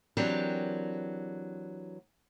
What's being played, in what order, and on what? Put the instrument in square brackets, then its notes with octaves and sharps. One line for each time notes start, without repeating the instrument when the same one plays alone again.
[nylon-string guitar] E3 F#3 C4 D4 G4 A#4